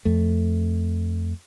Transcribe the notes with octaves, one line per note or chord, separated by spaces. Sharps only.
F2 A3